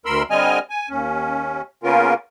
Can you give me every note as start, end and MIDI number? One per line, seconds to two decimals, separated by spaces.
0.06 0.23 38
0.06 0.23 70
0.06 0.23 83
0.06 0.23 84
0.06 0.23 88
0.30 0.59 50
0.30 0.59 55
0.30 0.59 60
0.30 0.59 75
0.30 0.59 80
0.30 0.59 89
0.70 0.89 80
0.89 1.62 39
0.89 1.62 61
1.83 2.14 49
1.83 2.14 58
1.83 2.14 59
1.83 2.14 61
1.83 2.14 65
1.83 2.14 70